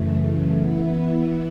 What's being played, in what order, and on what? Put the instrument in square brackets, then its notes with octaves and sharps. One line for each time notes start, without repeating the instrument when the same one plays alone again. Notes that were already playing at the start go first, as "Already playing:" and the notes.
Already playing: [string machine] F#2 C#3 E3 A3
E3 B3 E4